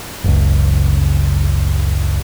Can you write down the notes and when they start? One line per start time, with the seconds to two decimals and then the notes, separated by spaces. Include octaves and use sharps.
0.24 F#1 C#2